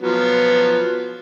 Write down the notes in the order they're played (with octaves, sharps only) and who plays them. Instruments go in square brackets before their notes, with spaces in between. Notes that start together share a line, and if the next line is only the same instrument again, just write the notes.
[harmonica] F3 F#3 B3